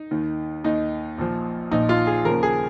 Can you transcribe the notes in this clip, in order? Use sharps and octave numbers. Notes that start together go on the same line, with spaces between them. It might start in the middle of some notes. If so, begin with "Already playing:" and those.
Already playing: D#4
D#2 D#3
D#2 D#3 D#4
A#1 A#2 F3
A#1 A#2 F3 D#4
F4
G#4
D#2 C#3 F3 A#4
G#4